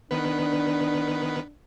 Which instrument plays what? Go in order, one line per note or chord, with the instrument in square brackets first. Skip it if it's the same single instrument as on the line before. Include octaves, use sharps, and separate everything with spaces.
[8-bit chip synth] D#3 B3 B4 [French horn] D4